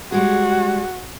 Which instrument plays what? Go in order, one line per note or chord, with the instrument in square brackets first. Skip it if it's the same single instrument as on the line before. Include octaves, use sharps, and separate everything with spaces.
[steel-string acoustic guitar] G3 G#3 G#4 [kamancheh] F#4